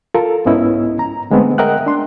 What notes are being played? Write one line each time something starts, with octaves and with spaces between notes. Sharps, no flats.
F4 A4 A#4
C2 G#2 B3 C#4 E4 D#5
A#5
D3 G#3 A3 B3 C4
A#4 D#5 E5 F#5 G5 F#6
D4 C6